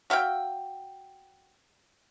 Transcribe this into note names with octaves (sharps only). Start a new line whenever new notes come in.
F#4 E5 F5 G5